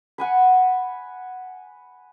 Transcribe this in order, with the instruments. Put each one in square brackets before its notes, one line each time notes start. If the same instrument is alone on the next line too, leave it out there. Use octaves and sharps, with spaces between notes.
[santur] F#5 G#5 B5